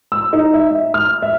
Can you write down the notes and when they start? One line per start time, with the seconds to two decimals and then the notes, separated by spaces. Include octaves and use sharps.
0.12 E6
0.33 D#4
0.54 E5
0.71 E5
0.94 F6
1.22 E5